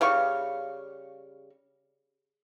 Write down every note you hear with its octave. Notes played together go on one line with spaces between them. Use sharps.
C#3 G3 F5 C#6